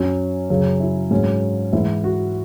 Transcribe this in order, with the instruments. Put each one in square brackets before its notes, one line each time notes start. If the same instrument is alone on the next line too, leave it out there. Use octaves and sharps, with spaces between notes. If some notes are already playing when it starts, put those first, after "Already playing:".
Already playing: [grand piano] F#2 F#3 C#4
F#2 C#3 F#3
E4
G#2 F#3 C#4
G#2 E3 E4
F#4